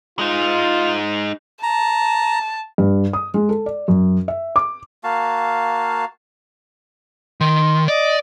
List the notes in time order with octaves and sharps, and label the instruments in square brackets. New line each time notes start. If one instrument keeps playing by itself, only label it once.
[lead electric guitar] G#3 D#4 [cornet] F4
[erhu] A5 [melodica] A#5
[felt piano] G2
D#6
G#3
A4
D5
F#2
E5
D6
[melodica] A#3 F#4 F5 A5
[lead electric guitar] D#3 [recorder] C6
[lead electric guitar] D5 [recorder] D#5